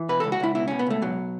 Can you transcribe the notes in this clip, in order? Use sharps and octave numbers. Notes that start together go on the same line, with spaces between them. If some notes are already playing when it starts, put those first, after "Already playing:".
Already playing: E3
B2 B4
C#2 A4
F#4
C#2 E4
B2 E4
B2 C#4
B3
C#2 A3
B2 F#3